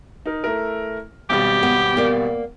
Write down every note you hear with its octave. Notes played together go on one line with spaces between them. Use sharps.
D#4 A#4
A3 E4 A#4
G#1 B2 G3 G4
B3
A#3 D5